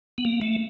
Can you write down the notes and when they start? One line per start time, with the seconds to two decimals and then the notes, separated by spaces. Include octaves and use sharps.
0.18 B3
0.25 A#3
0.41 A3